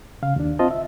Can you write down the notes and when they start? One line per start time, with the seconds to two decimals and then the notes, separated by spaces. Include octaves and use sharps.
0.22 C#3 F5
0.36 D#2 D4
0.59 C4 F4 C5 D#5 A5
0.71 E5